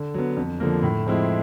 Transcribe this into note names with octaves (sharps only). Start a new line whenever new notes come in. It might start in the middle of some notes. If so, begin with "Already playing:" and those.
Already playing: D3
F#3 B3
F2
D3 F3 A#3
A2
F3 G#3 C4 E4